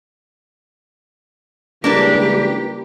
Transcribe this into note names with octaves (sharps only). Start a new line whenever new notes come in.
C#2 E3 G3 A#3 D4 G4 B4